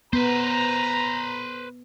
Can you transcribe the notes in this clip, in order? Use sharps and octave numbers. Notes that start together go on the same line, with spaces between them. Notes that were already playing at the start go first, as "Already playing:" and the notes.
B3 B4 C5 A#5